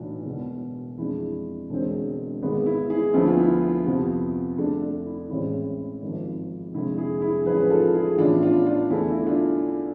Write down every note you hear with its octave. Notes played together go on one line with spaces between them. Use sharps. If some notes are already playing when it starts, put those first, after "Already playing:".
Already playing: B1 A2 E3 B3 D4
E1 E2 B2
F2 E3 G#3 D4 E4
E1 E2 D3 G#3 C4
G#1 G#2 G#3 B3
E4
E4 G#4
D2 D3 F3 B3 E4
F4
E4
F2 C3 F3 B3
F2 D3 A3 D4
D4
E4
A1 A2 E3 G#3 C4 E4
G#1 G#2 F3
F1 F2 D3 G#3 E4
E4 G#4
E4 G#4
A1 G#2 F3 G#4 B4
F4 A4
E4 G#4
A1 A2 E3 B3 D4 F4
D4 F4
D4 F4
E2 D3 A3 E4
E4
D4 F4